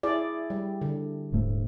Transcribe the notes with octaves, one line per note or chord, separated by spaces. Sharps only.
E4 G#4 D5
G3
D3
D#1 G#2 A3